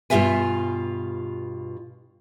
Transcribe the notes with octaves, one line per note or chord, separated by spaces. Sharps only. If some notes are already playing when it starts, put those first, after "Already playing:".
G2 B2 F4 G4 E5 G#5